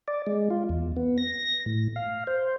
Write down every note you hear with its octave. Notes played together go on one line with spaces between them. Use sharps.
D5
G#3
F4
E2
B3
A#6
A2
F5
C5